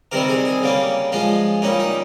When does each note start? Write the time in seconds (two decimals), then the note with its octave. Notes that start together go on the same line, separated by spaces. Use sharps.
0.12 C3 D#3 G3 C4 A#4
0.29 G#4
0.45 G#4
0.62 C#3 G3 A#3 C#4
1.12 F3 G#3 C#4 F4
1.62 A#2 G3 C#4 D#4
1.79 D#4